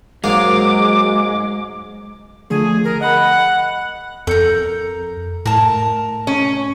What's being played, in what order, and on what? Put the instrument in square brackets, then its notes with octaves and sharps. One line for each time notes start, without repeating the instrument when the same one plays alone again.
[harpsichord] G#2 A#3 F5 [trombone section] F#3 [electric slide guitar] G#3 [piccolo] D6
[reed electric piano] D3 F3 A3 [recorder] G#4
[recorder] A#4
[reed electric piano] D#5 B5 [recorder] F#5
[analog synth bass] F2 [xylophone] A4 C#7 [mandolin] A#4 G6
[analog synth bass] A2 [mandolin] A#4 A5
[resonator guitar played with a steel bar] C#4